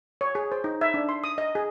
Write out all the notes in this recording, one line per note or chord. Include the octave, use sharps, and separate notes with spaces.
C#5
G#4
C5
D#4
E5
D4
C6
D#6
D#5
G#4